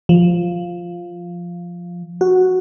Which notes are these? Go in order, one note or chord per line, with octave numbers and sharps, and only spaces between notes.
F3
F#4